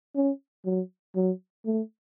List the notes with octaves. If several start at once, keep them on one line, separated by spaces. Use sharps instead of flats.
C#4
F#3
F#3
A3